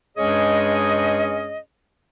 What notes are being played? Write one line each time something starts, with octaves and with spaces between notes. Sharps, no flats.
G2 G#3 C#4 G#4 C#5 D#5